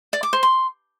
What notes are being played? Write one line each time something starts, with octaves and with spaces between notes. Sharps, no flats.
D5
D6
C5
C6